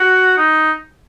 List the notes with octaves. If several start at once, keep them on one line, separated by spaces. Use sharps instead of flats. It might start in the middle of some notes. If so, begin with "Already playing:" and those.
Already playing: F#4
D#4